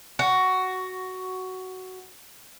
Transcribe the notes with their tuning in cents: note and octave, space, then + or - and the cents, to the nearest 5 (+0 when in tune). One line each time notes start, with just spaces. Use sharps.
F#4 +10